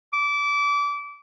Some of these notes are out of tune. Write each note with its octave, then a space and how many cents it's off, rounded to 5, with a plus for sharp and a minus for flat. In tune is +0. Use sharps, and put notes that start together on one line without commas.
D6 -25